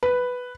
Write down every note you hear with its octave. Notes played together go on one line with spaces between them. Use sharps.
B4